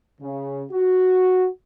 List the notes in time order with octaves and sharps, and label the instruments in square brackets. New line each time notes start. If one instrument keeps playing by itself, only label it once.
[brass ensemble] C#3
F#4